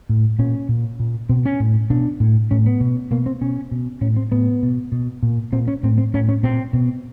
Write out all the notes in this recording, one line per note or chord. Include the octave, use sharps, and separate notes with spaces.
A2
A#2 C#4
A#2
A#2
B2 C4
C#4
A2
B2 D4
A2
A2 C#4
B3
B2
B2 A#3
C4
B2 C#4
B2
A2 C#4
C4
A2 B3
B2
B2
A#2
A#2 C4
C#4
A2 C4
C4
A2 C#4
C#4
A#2 C4
B2